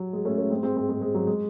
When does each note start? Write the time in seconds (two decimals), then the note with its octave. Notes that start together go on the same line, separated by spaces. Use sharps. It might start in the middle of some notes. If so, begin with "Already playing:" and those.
Already playing: F#3
0.13 G#3
0.25 A3 C#4
0.37 A3 C#4
0.50 G#3 C4
0.63 G#3 C4
0.76 G#3 C4
0.89 G#3 C4
1.01 G#3
1.15 F#3
1.27 G#3